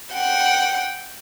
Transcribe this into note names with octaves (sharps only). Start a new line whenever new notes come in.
F#5 G5